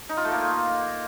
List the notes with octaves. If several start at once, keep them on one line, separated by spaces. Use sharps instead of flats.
D#4
F4
A3
A#3